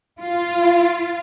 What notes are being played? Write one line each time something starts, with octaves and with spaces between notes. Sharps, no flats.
F4